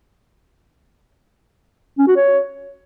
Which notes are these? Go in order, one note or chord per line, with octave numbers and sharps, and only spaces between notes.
C#4
F#4
C#5